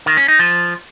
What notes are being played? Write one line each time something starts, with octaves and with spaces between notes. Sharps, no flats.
D#3
C#4
D#4
F3